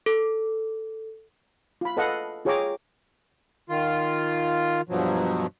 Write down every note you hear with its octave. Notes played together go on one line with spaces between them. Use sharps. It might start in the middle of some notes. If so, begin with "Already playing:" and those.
A4
F4 B5
A4 B4 D#5 F5 F#5
F4 G#4 C#5 G5 A#5 D6
D#3 F4
G2 B2 F3 F#3